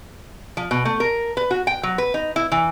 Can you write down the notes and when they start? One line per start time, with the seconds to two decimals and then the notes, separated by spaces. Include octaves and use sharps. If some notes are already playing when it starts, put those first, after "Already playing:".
0.57 F3
0.71 B2
0.85 A3
1.00 A#4
1.37 B4
1.51 F#4
1.67 G5
1.83 F#3
1.98 B4
2.14 D#4
2.36 E4
2.52 E3